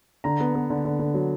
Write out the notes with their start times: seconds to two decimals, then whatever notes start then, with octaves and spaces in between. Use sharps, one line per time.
0.24 D3 A#5
0.40 B3
0.55 B3
0.70 D3
0.85 D3
0.99 D3
1.14 F#3